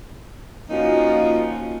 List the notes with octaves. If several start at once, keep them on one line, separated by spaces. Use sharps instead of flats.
F3 A#3 C#4 D#4 F4 F#4